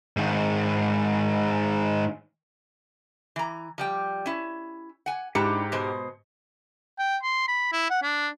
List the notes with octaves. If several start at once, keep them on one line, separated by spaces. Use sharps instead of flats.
G#2 D#3
E3 A#5
F3 G3 G5
C#4 E4
F#5 G#5
G#2 D4 E4 G4 A#5 C#7
B2 G#3 C5
G5
C6
B5
E4
F#5
D4